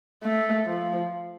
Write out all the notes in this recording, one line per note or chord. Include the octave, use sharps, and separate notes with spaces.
A3
F3